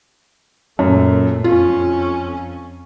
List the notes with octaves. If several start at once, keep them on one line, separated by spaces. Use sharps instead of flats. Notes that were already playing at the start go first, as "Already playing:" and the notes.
F#2 A#2 A3
F2 C#4 F4